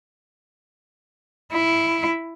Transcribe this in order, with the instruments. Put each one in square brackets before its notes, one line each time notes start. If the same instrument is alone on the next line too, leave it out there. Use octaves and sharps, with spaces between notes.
[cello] E4